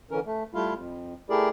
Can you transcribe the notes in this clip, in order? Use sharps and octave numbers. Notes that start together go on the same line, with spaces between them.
D3 E3 C#4 A#4
A3
G3 A3 E4 F4 F5
F2
A3 E4 G4 G#4 A#4 D5